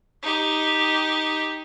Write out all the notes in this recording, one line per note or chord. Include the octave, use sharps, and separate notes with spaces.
D#4 G4